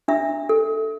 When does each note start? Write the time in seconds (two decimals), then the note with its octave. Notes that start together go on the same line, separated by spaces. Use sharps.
0.08 D4 E5
0.49 A4